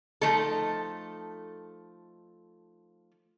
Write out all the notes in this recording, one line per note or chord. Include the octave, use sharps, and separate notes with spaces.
F3 A3 D#4 A4